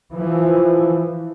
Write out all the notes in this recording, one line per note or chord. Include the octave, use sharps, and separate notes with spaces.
E3 F3